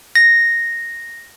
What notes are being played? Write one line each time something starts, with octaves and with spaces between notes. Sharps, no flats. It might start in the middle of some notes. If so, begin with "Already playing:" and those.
A#6